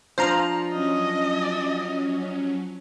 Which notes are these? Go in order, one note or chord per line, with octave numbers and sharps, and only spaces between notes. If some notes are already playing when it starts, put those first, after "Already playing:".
F3 D4 C5 F5 A#5
F#3 C#4 D#5